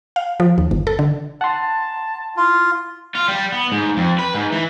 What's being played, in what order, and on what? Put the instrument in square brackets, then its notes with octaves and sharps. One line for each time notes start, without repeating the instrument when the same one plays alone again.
[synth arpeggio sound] F5
F3
D#2
G1
A4
D3
[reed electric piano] F#5 C6 [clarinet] A5
[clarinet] E4 [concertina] F4
[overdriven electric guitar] F4
G3
B3
G#2
F2
B4
G#2
E3